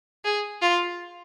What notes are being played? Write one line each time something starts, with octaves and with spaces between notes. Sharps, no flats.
G#4
F4